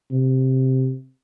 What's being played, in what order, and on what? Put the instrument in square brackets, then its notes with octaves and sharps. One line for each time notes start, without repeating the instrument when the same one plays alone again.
[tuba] C3